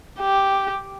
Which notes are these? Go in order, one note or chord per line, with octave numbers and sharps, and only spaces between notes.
G4